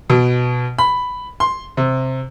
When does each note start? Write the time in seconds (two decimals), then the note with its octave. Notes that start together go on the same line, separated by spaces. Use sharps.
0.10 B2
0.78 B5
1.40 C6
1.77 C3